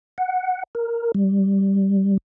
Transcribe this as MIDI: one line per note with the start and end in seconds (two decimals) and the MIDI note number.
0.18 0.63 78
0.75 1.12 70
1.15 2.17 55